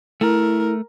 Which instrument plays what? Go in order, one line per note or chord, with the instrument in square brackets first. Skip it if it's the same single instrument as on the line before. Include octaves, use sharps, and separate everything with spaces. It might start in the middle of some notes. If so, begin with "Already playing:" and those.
[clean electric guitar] A3 [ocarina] E4 [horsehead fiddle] A#4